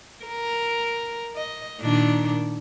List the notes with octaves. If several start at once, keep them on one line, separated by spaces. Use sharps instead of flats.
A#4
D#5
A#2 D#3 D4